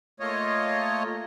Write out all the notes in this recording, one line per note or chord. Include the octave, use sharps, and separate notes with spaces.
A3 A#3 F4 C#5 D#5